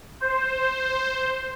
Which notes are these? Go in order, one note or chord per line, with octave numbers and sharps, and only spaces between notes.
C5